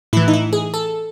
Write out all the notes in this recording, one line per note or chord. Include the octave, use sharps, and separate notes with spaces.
A2 E3 E4
D#4
E4
G#4
A4